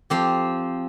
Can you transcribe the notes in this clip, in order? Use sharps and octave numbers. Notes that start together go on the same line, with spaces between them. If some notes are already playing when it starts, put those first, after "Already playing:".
F3 C4 G4